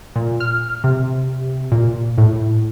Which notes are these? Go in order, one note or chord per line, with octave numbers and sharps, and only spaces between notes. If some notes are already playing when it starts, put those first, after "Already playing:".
A#2
F6
C3
A#2
A2